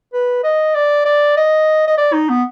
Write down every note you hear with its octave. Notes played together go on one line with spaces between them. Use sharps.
B4
D#5
D5
D5
D#5
D#5
D5
D#4
B3